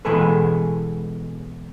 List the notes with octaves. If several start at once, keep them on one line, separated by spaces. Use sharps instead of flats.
B2 E3 G#3 G#4 A4 B4